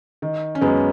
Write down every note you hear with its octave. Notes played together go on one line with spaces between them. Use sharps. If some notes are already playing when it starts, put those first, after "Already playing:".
D#3
C#4
F#2 G#3 B3